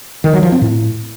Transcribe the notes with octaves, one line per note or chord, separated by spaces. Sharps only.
D#3
F#3
F3
C4
A2